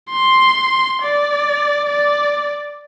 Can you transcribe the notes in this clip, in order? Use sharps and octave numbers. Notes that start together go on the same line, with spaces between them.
C6
D5
D5